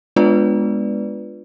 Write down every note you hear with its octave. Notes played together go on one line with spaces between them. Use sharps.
G#3 B3 D4 F4 B4 D5